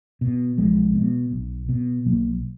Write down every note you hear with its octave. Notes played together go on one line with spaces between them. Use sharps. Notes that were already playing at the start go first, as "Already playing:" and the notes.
B2
B1 F3 G#3
B2
B1
B2
B1 F#3 A#3